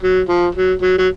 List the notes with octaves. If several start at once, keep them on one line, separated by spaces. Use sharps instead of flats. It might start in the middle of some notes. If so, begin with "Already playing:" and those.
F#3
F3
F#3
F#3
F#3